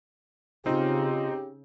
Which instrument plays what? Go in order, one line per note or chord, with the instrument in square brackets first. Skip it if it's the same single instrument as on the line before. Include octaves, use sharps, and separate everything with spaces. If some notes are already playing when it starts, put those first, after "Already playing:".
[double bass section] C#3 [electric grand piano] C4 D#4 [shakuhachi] F4 [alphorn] G4